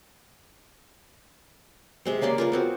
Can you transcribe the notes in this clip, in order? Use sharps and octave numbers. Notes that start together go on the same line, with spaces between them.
C3 G#3 C4
C#3 A#3 D5 C6
F4 A#4 B4
B3 C4 F#4